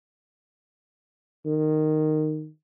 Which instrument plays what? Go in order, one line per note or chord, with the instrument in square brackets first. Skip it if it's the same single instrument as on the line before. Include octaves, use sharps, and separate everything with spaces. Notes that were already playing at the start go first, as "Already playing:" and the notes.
[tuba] D#3